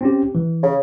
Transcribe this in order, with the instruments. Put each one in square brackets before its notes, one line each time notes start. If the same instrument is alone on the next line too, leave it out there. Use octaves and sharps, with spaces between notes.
[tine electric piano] C4 C#4 G4
E3
[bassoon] C#3